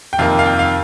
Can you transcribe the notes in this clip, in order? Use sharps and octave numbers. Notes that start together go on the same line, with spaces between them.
G5
F2 C3 D#3 A#3 F5
F5
G5
F5